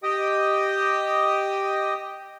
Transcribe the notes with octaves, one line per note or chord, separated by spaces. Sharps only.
G4 D#5 G5 D#6